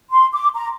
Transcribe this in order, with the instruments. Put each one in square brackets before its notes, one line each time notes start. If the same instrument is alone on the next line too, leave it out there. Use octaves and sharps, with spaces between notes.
[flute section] C6
D6
A#5